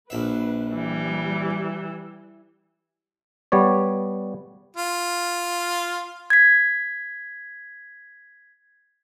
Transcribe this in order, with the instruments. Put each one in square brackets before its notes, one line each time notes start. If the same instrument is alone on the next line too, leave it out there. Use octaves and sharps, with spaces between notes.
[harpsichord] A#1 E5 [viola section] B4
[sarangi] E3 [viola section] G3
[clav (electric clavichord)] G3 B3 C#5 D5
[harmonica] F4
[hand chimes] G#6 B6